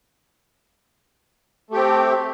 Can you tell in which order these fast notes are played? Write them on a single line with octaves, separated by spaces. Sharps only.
A3 G4 C4